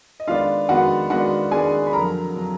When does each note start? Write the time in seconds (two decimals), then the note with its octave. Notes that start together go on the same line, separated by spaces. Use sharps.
0.20 D#5
0.27 D#3 G#3 B3 D4 F4 F5
0.69 D#3 G#3 B3 D4 F#4 F#5
1.10 D#3 G#3 B3 D4 F#4 F#5
1.51 D#3 G#3 B3 D4 G#4 G#5
1.87 B5
1.92 F2 D3 F#3 A#4 A#5
2.35 D3 F#3